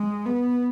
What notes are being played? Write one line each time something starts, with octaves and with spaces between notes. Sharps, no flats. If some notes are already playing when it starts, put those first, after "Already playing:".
Already playing: G#3
B3